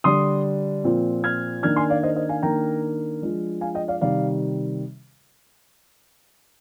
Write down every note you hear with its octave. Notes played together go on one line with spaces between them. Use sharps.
D3 G3 D4 C6 D#6
A#2 F3 C4
F6 G#6
D#3 A#3 D4 F6 G#6
G#5 C6
D5 F5
C5 D#5
C5 D#5
F5 G#5
D#3 A#3 D4 G5 A#5
F3 G#3 D4
F5 G#5
D#5 G5
D5 F5
C3 D#3 G3 D5 F5